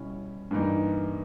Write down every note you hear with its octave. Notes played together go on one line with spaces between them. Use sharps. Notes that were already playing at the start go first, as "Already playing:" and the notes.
Already playing: B2 G3 C#4 E4
G2 E3 A#3 D#4